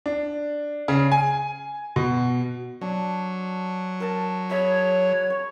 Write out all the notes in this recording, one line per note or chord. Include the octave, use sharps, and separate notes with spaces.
D4
C#3
G#5
B2
F#3 D4
A#4 A5
G#4 C#5 E5 B5
C#6